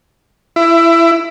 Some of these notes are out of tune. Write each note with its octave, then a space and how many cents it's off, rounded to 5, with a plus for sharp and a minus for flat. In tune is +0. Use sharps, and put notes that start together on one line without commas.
E4 +20